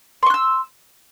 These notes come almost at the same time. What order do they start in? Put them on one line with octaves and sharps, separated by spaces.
C6 C#6 F#6 E6